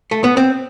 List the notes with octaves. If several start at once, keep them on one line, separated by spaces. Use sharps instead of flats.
A3
B3
C4